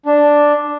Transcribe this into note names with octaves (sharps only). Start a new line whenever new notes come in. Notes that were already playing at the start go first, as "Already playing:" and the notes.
D4